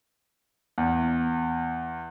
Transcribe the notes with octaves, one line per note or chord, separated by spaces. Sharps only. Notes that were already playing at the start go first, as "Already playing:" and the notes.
E2